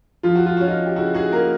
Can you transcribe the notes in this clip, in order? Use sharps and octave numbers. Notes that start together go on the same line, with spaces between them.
F3 F4
F#4
F4
C#4 F#4
D#4 F4
G4
C#3 E4 F#4
F#4 G#4
A#3 G#4 A#4